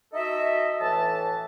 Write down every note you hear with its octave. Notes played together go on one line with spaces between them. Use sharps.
D#4 F#4 A4 D#5 E5
A2 E3 E5 A5